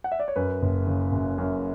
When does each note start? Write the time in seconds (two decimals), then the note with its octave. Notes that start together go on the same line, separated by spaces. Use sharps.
0.04 F#5
0.12 E5
0.19 D5
0.28 C#5
0.36 F#2 B4
0.62 F#1
0.87 C#3
1.12 F#1
1.38 F#2